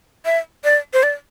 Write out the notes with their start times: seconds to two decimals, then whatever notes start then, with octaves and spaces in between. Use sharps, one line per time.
0.25 E5
0.64 D5
0.93 C5
1.03 D5